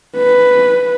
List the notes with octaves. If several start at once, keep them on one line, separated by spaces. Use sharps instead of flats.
B4